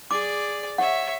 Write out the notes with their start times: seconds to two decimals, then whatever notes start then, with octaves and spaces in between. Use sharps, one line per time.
0.11 G#4 D5 D6
0.78 C#5 E5 F#5